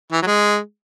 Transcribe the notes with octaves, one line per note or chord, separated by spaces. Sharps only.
E3
F#3
G#3